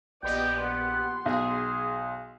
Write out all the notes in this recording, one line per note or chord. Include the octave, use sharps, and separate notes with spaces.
A#1 B3 G4 D5 D#5 G5
F#5 C6
B1 G#4 D#6